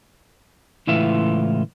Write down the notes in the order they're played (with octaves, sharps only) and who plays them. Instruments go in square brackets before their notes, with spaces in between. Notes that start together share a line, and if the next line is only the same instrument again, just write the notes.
[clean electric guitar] C#2 A2 E3 F4 E5 C6